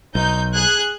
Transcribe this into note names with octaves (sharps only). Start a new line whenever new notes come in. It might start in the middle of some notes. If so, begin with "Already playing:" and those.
B1 D#4 G6
G#4 F#6 G#6